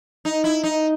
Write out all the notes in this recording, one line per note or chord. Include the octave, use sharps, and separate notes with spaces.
D#4
E4
D#4